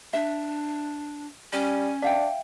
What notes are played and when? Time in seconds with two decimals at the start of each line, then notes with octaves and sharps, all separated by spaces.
0.13 D4 E5
1.53 G3 C#4
2.02 D4 E5 F5 G5